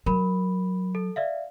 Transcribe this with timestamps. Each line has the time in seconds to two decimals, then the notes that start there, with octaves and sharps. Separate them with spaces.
0.06 F#3 A#4 B5
0.95 A4
1.16 D5 E5 F5